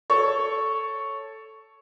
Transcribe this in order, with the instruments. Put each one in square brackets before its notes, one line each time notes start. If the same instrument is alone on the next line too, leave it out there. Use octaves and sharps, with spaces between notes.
[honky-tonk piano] A4 C#5